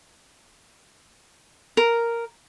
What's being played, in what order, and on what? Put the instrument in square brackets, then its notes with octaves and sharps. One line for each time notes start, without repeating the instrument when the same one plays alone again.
[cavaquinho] A#4